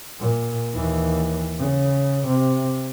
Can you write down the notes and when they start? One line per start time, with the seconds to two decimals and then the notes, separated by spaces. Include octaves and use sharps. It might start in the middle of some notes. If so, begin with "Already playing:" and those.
0.20 A#2
0.74 D#2 E3
1.58 C#3
2.27 C3